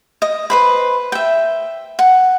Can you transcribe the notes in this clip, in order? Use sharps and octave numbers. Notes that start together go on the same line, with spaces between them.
D#5
B4 C5 B5
E5 G5
F#5